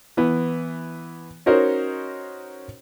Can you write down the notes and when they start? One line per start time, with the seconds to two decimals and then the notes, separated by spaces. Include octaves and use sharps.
0.17 E3 B3
1.46 C#4 D#4 F#4 A#4 C5 C#5